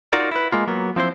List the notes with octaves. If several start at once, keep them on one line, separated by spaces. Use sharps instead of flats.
D#4 F4 F#4 A#4 D5
E4 B4
G#3 A#3 F4
F#3 A#3 B3
F3 C4 E4 C5